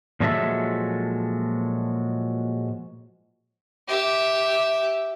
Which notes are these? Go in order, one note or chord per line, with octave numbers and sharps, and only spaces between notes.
A#2 F3 F#3 G#3 A4 E5
G4 E5